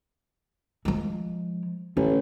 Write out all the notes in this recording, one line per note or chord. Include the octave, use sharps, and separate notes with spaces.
F3 G#3
A1 D3